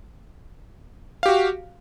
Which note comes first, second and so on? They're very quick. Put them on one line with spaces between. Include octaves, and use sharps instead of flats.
F5 G4 F#4